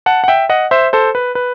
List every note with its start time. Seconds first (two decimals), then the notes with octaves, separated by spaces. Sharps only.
0.06 F#5 A5
0.24 F#5
0.28 E5 G5
0.49 D#5 F#5
0.71 C5 E5
0.93 A4 C5
1.15 B4
1.35 B4